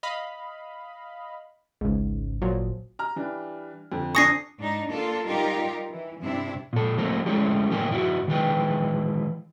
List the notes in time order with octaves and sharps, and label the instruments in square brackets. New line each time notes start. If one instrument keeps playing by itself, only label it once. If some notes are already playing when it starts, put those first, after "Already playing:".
[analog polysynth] D#5 F5 B5
[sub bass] G#1 [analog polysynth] C#2 G#2
[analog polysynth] A#2 F3 F#3
[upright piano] A#5 F6
E3 G3 D4
F2 D3
[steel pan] D4 G#5 C#6 [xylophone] D#6 A#6 C7
[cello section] G#2 D4 D#4
A#3 D4 F4 A4
G3 D#4 F4 G4 A#4
E3
G2 C3 C4 D4 E4
[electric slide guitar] A#2 A4
E3 A3 A#3 C4
G#3 A3 C#4 E4 G4
A2 E3 A#3 G4 A#4 G#5
G2 E4 F#4
D#3 E3 G#3 B4 G5